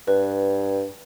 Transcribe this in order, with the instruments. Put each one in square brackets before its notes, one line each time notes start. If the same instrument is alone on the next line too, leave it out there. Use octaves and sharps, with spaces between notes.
[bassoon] G2 [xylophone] B4